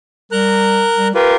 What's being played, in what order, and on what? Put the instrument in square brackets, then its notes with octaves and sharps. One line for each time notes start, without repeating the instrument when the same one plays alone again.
[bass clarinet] G3 [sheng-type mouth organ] A#4 A#5 F#6
[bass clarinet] G3
[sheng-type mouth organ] F4 G4 A#4 [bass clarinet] B4